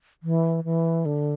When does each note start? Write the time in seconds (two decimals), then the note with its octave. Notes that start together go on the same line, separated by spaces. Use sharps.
0.23 E3
0.64 E3
1.05 D3